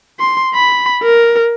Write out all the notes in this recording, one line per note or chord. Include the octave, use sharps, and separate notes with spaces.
C6
B5
A#4